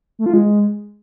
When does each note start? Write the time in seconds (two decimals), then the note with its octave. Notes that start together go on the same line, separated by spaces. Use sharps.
0.19 A3
0.26 F4
0.34 G#3